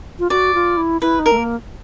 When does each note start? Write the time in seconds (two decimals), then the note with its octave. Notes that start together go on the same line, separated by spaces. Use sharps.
0.19 F4
0.30 F#4 D5
0.54 F4
0.77 E4
1.01 E4 B4
1.19 D#4
1.26 A#4
1.32 A3
1.37 A#3